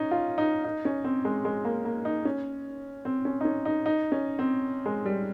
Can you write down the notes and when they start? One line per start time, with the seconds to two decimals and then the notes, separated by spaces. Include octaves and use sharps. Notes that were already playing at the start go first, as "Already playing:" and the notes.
Already playing: C#4 D#4
0.11 F4
0.38 D#4
0.64 D#4
0.85 C#4
1.04 C4
1.25 G#3
1.45 G#3
1.65 A#3
1.85 A#3
2.05 D#4
2.25 C#4
3.05 C4
3.25 C#4
3.41 D#4
3.45 C#4
3.65 D#4
3.86 D#4
4.12 C#4
4.39 C4
4.85 G#3
5.05 G3